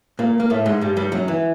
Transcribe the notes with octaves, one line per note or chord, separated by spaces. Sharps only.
A#2 A#3
A#3
A2 A3
G#2 G#3
G2 G3
G2 G3
F#2 F#3
E3